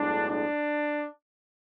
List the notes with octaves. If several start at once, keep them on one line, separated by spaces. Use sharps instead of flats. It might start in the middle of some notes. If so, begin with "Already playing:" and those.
Already playing: B1 A2 G#3 D4
D4